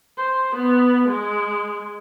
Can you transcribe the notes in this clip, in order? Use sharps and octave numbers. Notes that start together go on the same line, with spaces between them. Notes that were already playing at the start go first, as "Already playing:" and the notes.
C5
B3
G#3